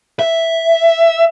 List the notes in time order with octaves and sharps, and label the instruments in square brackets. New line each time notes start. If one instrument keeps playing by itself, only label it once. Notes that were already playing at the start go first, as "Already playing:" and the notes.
[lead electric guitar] E5